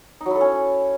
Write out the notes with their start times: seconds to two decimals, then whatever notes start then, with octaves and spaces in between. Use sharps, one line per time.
0.21 D#4
0.26 F#3
0.31 E4
0.36 A4
0.41 C#4